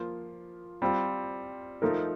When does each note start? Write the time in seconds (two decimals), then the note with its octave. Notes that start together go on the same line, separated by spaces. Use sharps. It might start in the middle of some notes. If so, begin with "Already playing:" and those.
Already playing: F3 A#3 F4
0.82 G3 C4 F4
1.82 F3 A3 D#4 A#4